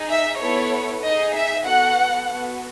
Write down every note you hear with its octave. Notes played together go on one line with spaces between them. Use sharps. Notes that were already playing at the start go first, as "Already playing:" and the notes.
Already playing: D#4 G#4
E5
B3 E4 A4 C#5
D#4 G#4 D#5
E5
B3 F#4 A4 F#5
B3 F#4 A4